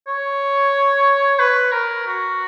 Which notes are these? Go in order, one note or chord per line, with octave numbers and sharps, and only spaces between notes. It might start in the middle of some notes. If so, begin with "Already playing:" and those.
C#5
B4
A#4
F#4